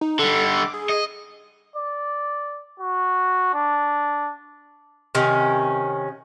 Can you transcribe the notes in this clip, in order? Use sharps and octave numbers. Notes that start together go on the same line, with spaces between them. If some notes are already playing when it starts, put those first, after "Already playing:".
D#4
D3 G3 A4
D6
G#4
D#5
D5
F#4
D4
C3 D#3 C#4